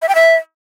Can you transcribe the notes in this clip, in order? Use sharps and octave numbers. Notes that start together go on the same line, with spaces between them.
E5
G5
E5